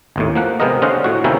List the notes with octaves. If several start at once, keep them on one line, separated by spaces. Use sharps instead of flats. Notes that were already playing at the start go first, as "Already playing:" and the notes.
G#1 D#2 A2
F3 A#3 F#5
C3 G#3 B3 A#4 D#5
D3 C#4 C5 D#5 F5 F#5
A2 F#4
C3 D#3 A#3 C#4 E4 A#4